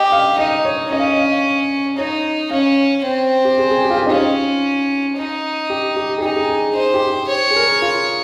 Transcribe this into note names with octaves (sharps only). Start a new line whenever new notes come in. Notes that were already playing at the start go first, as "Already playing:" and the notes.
Already playing: G4 D#5
F5
D#4 D#5
C#5
C#4 D#5
F5
D#5
F5
D#4 C#5
C#4 F5
C4
G4
G#4
G#4
G4
F4
G4
D#4
C#4 F4
D#4
G4
G4
G#4
D#4 G4
G#4
G#4
D#4 C5
G4
G4
C#5
G#4
A#4
F4